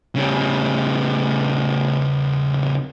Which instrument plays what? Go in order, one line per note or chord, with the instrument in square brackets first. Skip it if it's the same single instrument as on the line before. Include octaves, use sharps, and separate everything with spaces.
[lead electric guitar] C#3 G3